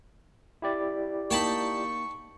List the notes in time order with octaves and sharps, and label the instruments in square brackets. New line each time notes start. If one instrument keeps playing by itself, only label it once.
[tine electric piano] E4 G4 D5
[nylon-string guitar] A#3 D#4 [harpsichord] G5 A5 B5 [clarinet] C#6